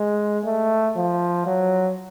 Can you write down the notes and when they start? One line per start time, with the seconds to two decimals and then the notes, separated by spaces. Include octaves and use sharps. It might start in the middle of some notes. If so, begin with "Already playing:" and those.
Already playing: G#3
0.44 A3
0.96 F3
1.47 F#3